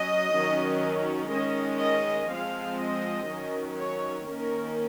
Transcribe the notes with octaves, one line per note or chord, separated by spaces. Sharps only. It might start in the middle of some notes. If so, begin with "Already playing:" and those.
Already playing: F#3 C#4 D#5
D#3 F#3 C#4
D#3 G#3 C#4 D#5
D#5
F3 G#3 C4 F5
D#5
D#3 F#3 C#4
C#5
D#3 A#3 C#4 A#4